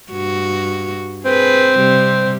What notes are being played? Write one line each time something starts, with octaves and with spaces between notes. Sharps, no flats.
G2 F#4
C4 G#4 B4
C3 G3